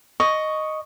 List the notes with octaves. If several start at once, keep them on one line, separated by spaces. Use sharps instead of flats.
D#5 C#6